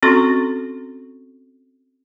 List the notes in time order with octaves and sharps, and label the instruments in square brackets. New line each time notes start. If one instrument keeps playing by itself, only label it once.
[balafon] C4 C#4 F#4 A4 C6 C#6